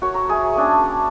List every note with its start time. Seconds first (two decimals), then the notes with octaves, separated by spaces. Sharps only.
0.02 F#4 A#4 C#5
0.14 A#5 E6
0.29 G#4 E5
0.56 A#3 C#4 D4 A5
0.83 F#5